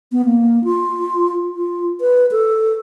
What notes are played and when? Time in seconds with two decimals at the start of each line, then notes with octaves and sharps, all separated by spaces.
0.12 B3
0.25 A#3
0.64 F4
1.56 F4
2.01 B4
2.31 A4